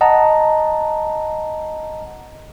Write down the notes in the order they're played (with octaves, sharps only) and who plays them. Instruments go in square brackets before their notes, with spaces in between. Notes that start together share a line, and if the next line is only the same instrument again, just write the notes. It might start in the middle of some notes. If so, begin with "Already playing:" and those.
[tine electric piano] D#5 F#5 A5 A#5